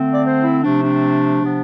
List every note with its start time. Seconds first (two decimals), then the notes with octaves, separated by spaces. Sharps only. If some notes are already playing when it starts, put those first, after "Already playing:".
Already playing: D3 A3 C4
0.14 D5
0.24 C5
0.43 E4
0.63 C3 F3 A3 C4 D4
0.83 D4
1.42 C3 F3 B3